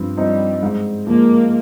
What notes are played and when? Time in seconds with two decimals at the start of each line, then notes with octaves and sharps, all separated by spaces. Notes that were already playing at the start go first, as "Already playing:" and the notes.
Already playing: G2 F3 C4
0.17 F3 G3 C4 D#4
0.63 G#2
1.07 F3 G#3 A#3